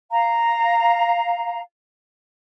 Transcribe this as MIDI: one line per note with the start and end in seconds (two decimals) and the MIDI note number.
0.11 1.61 77
0.11 1.61 82